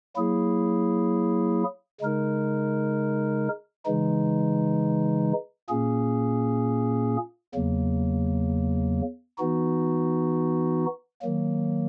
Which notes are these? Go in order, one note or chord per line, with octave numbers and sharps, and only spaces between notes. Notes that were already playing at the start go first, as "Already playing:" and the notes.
F#3 A#3 E4 G#4
C#3 G#3 D#4 A#4
C#3 E3 G#3 D#4
A#2 A#3 C#4 G#4
E2 C#3 F#3 A#3
E3 B3 D#4 F#4
D#3 F#3 A#3